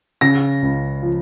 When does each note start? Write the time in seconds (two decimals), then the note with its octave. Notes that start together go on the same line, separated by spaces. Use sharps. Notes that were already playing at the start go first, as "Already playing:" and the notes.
0.21 C#3 A#6
0.62 C#2
1.02 F3